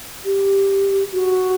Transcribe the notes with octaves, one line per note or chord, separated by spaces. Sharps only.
G4
F#4